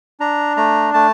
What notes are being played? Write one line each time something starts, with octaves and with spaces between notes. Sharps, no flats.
D4 A#5
A3 A#5
A3 A5